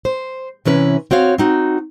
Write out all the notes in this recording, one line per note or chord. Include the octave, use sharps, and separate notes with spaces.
C5
C3 E3 C#4 B4
C4 F#4 C#5 F5
C4 D#4 F#4